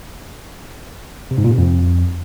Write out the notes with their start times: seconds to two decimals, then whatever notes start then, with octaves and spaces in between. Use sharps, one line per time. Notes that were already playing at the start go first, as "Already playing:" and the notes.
1.31 C3
1.38 G#2
1.44 A#2
1.51 C3
1.58 F2